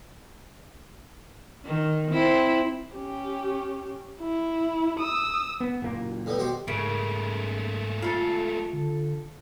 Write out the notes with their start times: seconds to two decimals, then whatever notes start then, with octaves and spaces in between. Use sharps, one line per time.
1.66 D#3
2.12 C4 E4
2.95 C#4 G4
4.21 E4
5.00 D#6 E6
5.60 B3
5.82 F#1 A#2 A#3
6.26 A2 G3 B3
6.39 B2 F#4 G4 C5
6.68 G#2 C#3 G#3 A3 A#4 D7
8.02 F4 A4 F5
8.73 D3